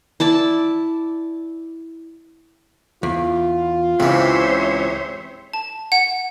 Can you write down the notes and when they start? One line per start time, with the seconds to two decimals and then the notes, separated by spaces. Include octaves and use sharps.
0.20 E4 D5 A5
3.03 E2 F4
4.00 C#2 C3 E3 C5 C#5 E5
5.53 A5
5.92 F#5